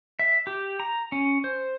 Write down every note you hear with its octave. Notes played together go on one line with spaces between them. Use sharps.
E5
G4
A#5
C#4
C5